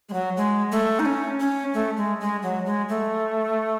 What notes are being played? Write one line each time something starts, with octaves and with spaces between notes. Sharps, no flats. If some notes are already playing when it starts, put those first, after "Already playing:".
G#3
F#3
G#3
A3
D#4
C#4
C#4
A3
G#3
G#3
F#3
G#3
A3